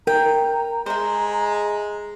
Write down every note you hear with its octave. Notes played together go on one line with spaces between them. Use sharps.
A#4 G5 A#5
G#3 C5 E5 A#5